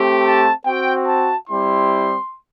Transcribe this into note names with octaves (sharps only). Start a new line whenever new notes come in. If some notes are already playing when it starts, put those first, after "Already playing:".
Already playing: A3 C4 G4
A5
C4 F#4 G5
A5
G3 C4 E4 G4 C6